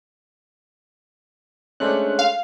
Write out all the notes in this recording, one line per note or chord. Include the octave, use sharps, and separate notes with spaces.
G#3 A3 C#4 D4 C5 F#6
F5